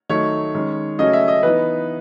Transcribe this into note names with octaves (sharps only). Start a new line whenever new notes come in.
D#3 F#3 A3 D#4 C#5
D#3 G#3 C#4
C#3 F#3 A3 C#4 D#5
E5
D#5
E3 B3 D#4 B4